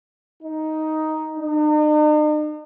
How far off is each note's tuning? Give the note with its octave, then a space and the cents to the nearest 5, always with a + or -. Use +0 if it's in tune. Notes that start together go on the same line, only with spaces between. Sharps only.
D#4 +5
D#4 -45